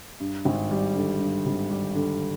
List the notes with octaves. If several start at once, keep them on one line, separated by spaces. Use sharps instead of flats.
G2
G#1
G3
D3
G2
G#1
G3
D3